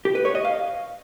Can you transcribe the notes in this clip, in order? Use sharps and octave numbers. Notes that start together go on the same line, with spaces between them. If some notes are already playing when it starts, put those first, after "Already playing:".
G4
B4
C#5
D#5
F5